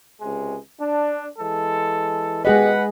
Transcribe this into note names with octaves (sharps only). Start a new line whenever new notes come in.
C#2 C3 G#3
D4
E3 G#3 A4
B2 D#3 G#3 G4 G#4 B4 D#5 F#5